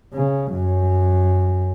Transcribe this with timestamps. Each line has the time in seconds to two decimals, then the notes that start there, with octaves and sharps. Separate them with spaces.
0.14 C#3
0.52 F#2